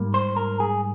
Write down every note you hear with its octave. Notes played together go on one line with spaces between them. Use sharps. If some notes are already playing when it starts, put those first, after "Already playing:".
Already playing: G#2 G3 A#3
C5
A#4
G#4